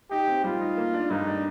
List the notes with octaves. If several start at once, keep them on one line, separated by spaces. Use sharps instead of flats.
D#4 G4
C4
G3 F4
D#4
A#3
D4
G2 D#4
D4